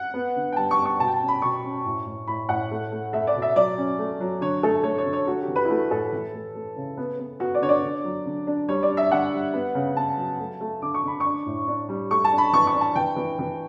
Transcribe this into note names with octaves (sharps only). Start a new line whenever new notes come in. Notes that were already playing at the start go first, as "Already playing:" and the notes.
Already playing: F#5
B3
D3
G5
G3 A5
C#6
B3
C#6
B2 A5
G5
A5
C#4
B5
B2 C#6
C#4
A2
A2
A2 B5
A2 F#5
A3
A3
A3 E5
D5
B2
E5
F#3 D5
C#4
A3
F#3
D3 C#5
A3 A4
A3 C#5
C#5
D3
C#5
A3 F#4
G4
E3
B4
E4
A3 F#4
A2 A4
E3
A3
A3
C#3
B3
B3
B3 F#4
D5
D3 C#5
D5
D3
F#3
D3
D4
G3 C#5
D5
D4
E5
D3 F#5
G3
B3
C#3
B3 A5
F#3
A3
A3
D3 D6
C#6
D3 B5
D4 C#6
A2
D4
G3
A3 C#6
A5
D4
B5
E3 C#6
C#6
D4
A5
E3 G5
E3
E3